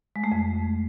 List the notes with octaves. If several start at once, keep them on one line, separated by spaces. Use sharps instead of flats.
G#3
A3
F2